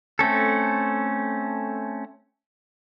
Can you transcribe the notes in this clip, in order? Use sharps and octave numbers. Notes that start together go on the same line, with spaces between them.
A3 C4 C#4 A4